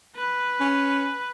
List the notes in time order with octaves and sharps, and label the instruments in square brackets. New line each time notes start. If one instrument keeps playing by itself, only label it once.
[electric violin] B4
[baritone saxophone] C#4